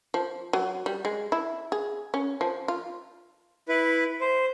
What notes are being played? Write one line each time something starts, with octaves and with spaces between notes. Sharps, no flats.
F3
F#3
G3
G#3
E4
G#4
C#4
F3
F4
E4 B4
C5